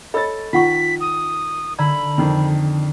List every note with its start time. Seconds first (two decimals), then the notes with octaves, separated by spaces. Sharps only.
0.14 A4 C#5 D#5 B5 E6 A6
0.53 D#3 F4 F#5 C#6 B6
1.01 D#6
1.79 D3 D5 A#5 B5 E6
2.18 F2 D#3